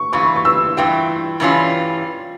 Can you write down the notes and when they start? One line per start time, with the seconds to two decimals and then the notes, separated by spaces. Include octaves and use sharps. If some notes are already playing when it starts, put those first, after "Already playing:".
Already playing: C#6
0.13 G2 E3 F4 C#6
0.36 C#6
0.45 E6
0.77 G2 E3 F4 G5
1.40 G2 E3 G3 C#4 F4